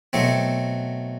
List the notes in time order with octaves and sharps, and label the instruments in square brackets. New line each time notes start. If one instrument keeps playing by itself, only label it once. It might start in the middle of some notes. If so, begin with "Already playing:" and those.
[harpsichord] B2 F#3 A3 C4